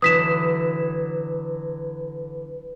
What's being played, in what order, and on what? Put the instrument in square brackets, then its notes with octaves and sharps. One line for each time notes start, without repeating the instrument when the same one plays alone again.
[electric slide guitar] D3 E3 F#3 [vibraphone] B4 [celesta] D#6 B6 E7